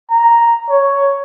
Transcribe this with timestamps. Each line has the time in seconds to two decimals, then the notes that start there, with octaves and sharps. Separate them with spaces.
0.10 A#5
0.70 C#5